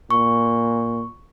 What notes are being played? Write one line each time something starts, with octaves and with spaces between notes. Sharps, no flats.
A#2 C#6